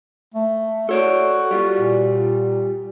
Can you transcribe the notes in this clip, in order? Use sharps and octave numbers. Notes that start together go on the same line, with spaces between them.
A3
F#4 A4 C#5 D5
G3 F4
A#2